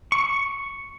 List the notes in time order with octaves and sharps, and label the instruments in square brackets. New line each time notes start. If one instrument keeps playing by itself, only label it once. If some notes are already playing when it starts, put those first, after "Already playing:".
[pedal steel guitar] C#6